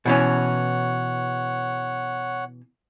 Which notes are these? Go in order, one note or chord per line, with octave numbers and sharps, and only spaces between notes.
B2 E3 C#4 C#5 F#5